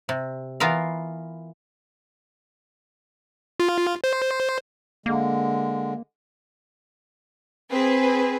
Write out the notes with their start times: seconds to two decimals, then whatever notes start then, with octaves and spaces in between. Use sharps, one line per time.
0.09 C3
0.60 E3 B3 F4 A#4 F5
3.60 F4
4.04 C5
5.06 D3 G#3 A#3
7.70 C4 G#4 B4